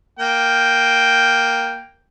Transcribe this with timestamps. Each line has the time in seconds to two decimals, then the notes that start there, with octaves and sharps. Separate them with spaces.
0.19 A#3 G5